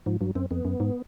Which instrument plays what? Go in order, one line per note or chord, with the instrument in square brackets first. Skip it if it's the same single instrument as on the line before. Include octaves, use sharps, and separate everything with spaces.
[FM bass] G#2 [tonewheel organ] F3
[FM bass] G2 [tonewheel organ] F#3
[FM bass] F#2 [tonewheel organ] C4
[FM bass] F2 [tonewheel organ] B3
[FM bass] F#2
G#2